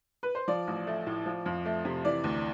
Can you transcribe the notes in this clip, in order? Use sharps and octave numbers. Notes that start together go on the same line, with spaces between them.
B4
C5
F3 D5
A1
A3
A2
F3
F2
A3
C3
E3 D5
D2